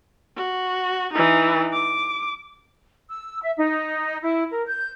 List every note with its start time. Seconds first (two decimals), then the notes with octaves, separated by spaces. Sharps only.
0.37 F#4
1.13 E3 D#4
1.73 D6
3.08 E6
3.42 E5
3.57 D#4
4.22 E4
4.51 A#4
4.66 G6